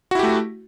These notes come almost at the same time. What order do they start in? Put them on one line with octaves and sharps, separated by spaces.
F#4 E4 G4 A3